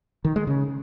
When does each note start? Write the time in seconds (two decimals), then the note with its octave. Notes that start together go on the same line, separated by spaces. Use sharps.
0.25 D#3
0.36 G#3
0.47 C#3